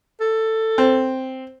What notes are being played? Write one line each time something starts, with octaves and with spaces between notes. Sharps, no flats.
A4
C4